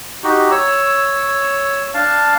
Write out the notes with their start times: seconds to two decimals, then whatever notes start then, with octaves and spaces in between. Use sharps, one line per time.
0.24 D#4 F#4 G4
0.51 C#5 E6
1.94 D4 F5 A5